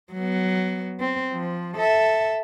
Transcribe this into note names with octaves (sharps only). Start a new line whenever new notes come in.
F#3 B3
C4
F3
A4 E5